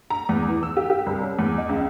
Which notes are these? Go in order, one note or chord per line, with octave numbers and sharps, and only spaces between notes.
A#5
E2
E3
E6
G4
G4
C2
C#4
E2
D#5
C#2